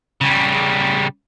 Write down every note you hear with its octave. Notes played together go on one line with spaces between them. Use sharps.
C#3 G3